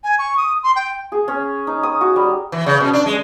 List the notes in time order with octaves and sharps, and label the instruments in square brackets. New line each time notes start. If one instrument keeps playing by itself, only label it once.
[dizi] G#5
C#6
D#6
C6
G5
[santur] G#4
C#4
D#4
D#6
F#4
G3
[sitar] E3
C#3
B2
D4
G#3